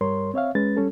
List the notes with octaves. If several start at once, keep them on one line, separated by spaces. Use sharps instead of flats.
G2 G3 A#4 C#5 C6
C4 C#5 E5 F5
G#3 C#4 B4 A6
G3 C#4 A4